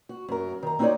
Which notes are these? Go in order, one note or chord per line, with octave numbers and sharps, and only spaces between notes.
F#4
F#2 A#4
D#3 A#5
C4 D#4 F#4 A4 C#5 D5